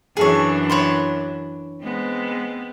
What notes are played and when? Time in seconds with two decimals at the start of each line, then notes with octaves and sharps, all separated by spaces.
0.17 F#2 E3 D4 G#4 A4 C#5
0.70 C#5 B5 C6
1.82 G#3 B3 C4